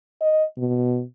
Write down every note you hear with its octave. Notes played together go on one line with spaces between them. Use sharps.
D#5
B2